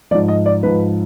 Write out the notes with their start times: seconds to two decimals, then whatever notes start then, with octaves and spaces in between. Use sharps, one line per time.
0.11 F3 D5
0.14 G#2
0.28 D#5
0.46 D5
0.63 G#2 F3 B4